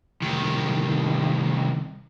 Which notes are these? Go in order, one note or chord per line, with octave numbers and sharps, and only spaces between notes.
C2 D#3